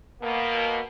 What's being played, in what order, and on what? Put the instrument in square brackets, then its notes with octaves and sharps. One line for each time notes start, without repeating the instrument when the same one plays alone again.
[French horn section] B2 A#3